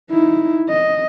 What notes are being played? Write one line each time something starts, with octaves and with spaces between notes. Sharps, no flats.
D#4 E4
D#5